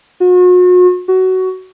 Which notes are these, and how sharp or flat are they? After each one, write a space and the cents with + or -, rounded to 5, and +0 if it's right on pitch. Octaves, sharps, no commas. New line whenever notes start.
F#4 -40
F#4 +15